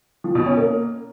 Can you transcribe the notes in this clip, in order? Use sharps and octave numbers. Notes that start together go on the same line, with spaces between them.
F3
B2
C#4
A#3